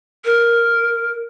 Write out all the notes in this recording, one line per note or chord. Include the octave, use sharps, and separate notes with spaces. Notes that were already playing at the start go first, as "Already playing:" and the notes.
A#4